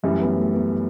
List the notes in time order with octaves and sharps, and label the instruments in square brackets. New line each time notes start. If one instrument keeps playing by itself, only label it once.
[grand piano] F#2 E3 G3 [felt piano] A3 C#4
[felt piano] B3
A3
B3